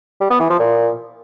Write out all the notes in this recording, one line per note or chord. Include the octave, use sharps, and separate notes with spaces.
G3
B3
E3
F3
A#2